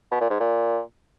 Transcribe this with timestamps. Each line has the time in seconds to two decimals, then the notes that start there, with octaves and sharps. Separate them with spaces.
0.12 B2
0.21 A#2
0.30 G#2
0.40 A#2